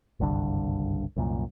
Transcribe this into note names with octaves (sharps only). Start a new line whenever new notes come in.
F#1 C2 G2 D3
C2 F#2 A#2